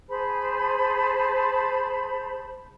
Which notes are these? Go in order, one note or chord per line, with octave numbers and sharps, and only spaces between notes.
G#4 C5 A5 B5